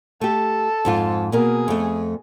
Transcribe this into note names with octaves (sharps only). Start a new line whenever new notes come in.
A3 G4 A4
F2 G#2 F4
B2 A#3 G#4 A#4
F2 A3